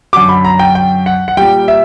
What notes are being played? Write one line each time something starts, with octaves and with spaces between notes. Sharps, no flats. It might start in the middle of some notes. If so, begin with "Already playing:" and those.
F#2 D3 F#3 D6
B5
A#5
G5
G5
F#5
F#5
A#2 G3 G5
E5